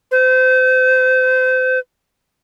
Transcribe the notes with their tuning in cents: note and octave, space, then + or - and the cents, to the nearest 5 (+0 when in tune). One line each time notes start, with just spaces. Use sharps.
C5 -30